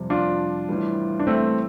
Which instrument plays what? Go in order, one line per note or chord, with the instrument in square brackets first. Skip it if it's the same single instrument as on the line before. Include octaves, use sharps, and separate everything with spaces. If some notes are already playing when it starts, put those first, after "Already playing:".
Already playing: [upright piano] F2 C3 G3
[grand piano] D4 F4
[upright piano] A2 E3 G3
[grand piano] D4
A3 C4